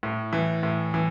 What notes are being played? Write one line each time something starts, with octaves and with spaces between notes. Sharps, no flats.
A2
E3
A2
E3